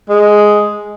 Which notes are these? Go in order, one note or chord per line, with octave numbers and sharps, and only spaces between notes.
G#3